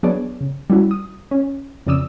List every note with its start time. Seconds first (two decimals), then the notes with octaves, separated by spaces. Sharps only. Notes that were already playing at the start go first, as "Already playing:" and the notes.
0.03 F#3 B3 D4 G#4 C#5 D5
0.41 C#3
0.70 G3 C#4 E4 F#4
0.91 D#6
1.31 C#4
1.86 F2 C#3 D5 D#6 E6